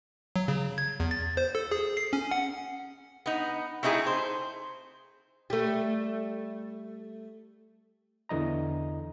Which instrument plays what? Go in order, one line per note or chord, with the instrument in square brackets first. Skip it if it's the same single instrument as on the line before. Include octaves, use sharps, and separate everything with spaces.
[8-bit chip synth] F#3
C#3
G#6
E2
A6
C5
A4
G#4
C7
C#4
F#5
[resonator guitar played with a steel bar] B3 D#4
A3 C4 D#4 E4 G#4
C5
[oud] G3 A3
[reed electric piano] E2 D3 E3 D#5 A#5